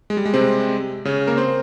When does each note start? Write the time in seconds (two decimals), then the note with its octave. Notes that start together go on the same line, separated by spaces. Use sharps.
0.10 G#3
0.17 G3
0.25 G#3
0.34 C3 C4
1.05 C#3 C#4
1.27 A#3 A#4
1.37 C4 C5